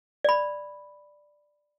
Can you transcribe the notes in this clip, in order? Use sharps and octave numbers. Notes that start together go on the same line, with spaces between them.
D5 B5